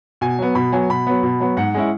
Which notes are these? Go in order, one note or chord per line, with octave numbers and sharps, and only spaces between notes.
B2 G#5
F#3 B3
B2 B5
F#3 B3 G#5
B2 B5
F#3 B3
B2
F#3 B3
G#2 F#5
G#3 C#4 E4